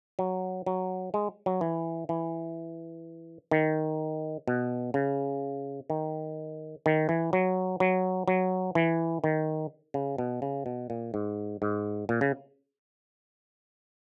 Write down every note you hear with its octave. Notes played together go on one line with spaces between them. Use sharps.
F#3
F#3
G#3
F#3
E3
E3
D#3
B2
C#3
D#3
D#3
E3
F#3
F#3
F#3
E3
D#3
C#3
B2
C#3
B2
A#2
G#2
G#2
A#2
C#3